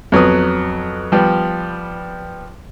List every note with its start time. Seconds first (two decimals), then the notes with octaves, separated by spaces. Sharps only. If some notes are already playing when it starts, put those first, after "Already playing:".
0.12 F2 F#3 B3 D#6
1.12 F3 G3 B3